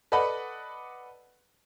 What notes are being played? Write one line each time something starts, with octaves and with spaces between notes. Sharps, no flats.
A4 B4 D5 D#5 F#5 B5